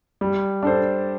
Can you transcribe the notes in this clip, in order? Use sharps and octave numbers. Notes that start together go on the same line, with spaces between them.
G3
D4 A4 C5